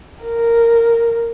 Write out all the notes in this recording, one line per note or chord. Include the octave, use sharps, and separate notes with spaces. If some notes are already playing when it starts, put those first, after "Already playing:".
A#4